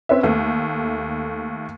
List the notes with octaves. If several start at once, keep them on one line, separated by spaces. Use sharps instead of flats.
C4 C#4 B4 E5
D#2 A3